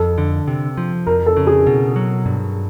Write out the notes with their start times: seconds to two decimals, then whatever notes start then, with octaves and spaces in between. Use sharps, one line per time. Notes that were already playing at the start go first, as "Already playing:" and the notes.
Already playing: F2 A4
0.18 D3
0.48 C3
0.77 F3
1.07 F2 A#4
1.26 A4
1.37 C#3
1.47 G#4
1.67 B2
1.96 F#3
2.26 G2